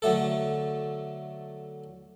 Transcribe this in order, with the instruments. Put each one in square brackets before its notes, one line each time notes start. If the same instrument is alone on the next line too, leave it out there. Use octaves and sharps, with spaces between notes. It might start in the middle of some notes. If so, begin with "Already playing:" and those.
[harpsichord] D3 F#3 A3 A4